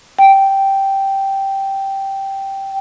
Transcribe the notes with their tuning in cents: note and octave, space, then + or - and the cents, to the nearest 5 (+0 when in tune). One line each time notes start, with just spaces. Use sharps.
G5 -5